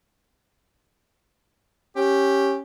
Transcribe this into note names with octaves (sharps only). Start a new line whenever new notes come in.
C#4 G4